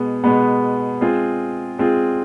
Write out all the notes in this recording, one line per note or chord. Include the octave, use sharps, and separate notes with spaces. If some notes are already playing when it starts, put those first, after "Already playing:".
Already playing: B2 G#3 B3
B2 G#3 B3
G#3 C4 F4 G#4
G#3 C4 F4 G#4